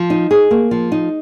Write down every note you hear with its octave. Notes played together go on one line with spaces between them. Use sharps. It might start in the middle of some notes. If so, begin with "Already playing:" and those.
Already playing: F3
D#4
G#4
A#3
F3
D#4